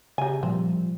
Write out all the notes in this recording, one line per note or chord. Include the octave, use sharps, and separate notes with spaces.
C#3 G4 E5 G#5 A#5
A#2 F3 G3 C4